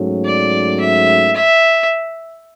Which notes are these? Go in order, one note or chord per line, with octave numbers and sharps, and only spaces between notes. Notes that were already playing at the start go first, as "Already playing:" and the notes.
Already playing: G#2 F#3 A3 C#4
D5
E5
E5